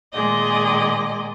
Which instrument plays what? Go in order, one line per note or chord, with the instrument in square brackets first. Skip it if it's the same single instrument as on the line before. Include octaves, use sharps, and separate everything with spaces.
[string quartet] A#2 D#3 G#3 G#4 D5 D#5